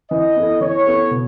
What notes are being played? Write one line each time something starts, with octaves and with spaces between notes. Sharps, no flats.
E3 D#5
B3 E4 A4
E3 C#5
B3 E4 A4
B2